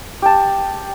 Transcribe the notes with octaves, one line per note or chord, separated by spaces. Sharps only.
G4 A5